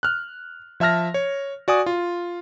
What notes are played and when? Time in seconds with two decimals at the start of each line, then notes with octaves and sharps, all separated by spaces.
0.03 F6 F#6
0.80 F3 E5 A5 F6 A#6
1.14 C#5
1.68 F#4 D5 G#5 D#6
1.86 F4